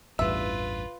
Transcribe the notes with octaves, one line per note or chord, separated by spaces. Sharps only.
A1 E2 G2 F4 B4 E5